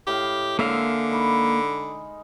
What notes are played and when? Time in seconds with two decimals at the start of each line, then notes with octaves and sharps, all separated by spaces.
0.07 A2 G4 D#5 F5
0.59 D3 G#3 A#3 E5 F5
1.11 D#4 B5 C#6